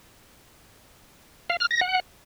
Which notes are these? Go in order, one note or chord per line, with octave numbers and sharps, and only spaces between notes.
F5
F6
A#6
F#5